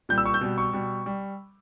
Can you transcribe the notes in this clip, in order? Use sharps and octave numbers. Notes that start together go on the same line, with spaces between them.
A#2 G3 G6
E6
C#6
G6
B2 G3
C#6
B2 G3
G3